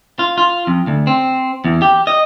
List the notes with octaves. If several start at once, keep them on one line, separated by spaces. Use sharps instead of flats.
F4
F4
F2
D2
C4
E2
G4
D#5